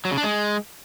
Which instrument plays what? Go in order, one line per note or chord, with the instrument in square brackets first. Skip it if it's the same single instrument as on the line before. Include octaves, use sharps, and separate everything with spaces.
[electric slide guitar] F#3
C#3
D4
G#3